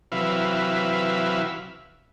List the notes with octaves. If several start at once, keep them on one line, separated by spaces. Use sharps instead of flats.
C3 E3 F#3 B4 E5 F5